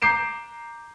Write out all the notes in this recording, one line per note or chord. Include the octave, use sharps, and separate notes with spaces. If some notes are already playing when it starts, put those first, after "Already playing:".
A#5 D6 G6 C7 D7 E7